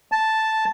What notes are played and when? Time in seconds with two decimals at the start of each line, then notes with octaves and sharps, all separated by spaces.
0.12 A5